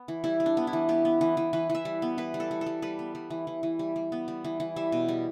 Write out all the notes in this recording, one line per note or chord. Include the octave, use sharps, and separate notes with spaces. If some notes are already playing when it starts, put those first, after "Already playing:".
Already playing: B3
E3
G3 E4
G3
D4
B3
E4
E3
B3 G4
B3
E3
E3
E3 B4
E3
E5
G3
B3
E3 B4
G3
A4
G3
A4
G3
G3 B4
B3
G3
E3
E3
E3
G3
G3
B3
G3
E3
E3
G3 E5
B2
G3